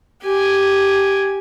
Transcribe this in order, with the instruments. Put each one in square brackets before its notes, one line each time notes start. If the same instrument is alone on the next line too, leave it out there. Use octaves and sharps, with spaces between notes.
[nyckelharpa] G4 G#5